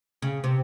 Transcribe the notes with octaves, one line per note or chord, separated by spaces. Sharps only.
C#3
C3